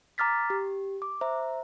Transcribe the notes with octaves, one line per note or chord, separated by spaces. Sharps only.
A#5 D6 F6 A6 B6
G4
D6
C5 E5 A#5